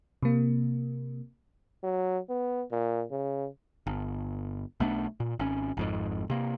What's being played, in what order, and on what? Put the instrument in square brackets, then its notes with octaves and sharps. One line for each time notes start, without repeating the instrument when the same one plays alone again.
[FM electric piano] C3 A#3
[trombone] F#3
B3
A#2
C#3
[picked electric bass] G1
B1 A3 B3 D4
A#2
G#1 C#4
G#1 F2 G#2
C3 A#3